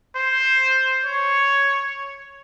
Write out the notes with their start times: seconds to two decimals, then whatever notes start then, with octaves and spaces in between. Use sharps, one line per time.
0.16 C5
1.04 C#5